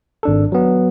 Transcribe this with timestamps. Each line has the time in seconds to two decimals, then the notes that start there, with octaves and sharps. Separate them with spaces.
0.23 G#1 D4 A4
0.52 F#3 B3